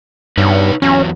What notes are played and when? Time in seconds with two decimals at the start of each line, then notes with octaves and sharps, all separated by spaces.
0.38 G2 D#4 B4 C#5
0.82 E2 F#3 C#4